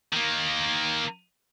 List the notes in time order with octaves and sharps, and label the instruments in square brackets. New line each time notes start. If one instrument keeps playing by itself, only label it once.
[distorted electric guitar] D#3 A#3